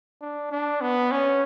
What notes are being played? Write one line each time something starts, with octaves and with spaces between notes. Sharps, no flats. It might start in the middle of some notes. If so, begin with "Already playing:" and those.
D4
D4
B3
C#4